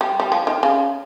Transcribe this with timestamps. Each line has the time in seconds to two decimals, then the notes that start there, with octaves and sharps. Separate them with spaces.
0.01 G3
0.20 G3
0.32 F3
0.47 D#3
0.63 C#3